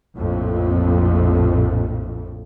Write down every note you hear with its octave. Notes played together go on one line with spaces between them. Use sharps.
A#1 F2 A2